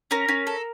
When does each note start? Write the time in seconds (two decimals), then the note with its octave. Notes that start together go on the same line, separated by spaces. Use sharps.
0.11 C#4 A#4
0.29 C#4
0.47 A4